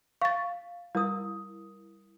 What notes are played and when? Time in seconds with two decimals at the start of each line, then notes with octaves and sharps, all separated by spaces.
0.21 F5 C#6 A6
0.95 G3 E4 A#4 D#6